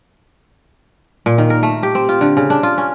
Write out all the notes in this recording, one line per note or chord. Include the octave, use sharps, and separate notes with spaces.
A#2
D#3
A#4
A3
G4
C4
F4
D3
C#3
D4
F4
C#4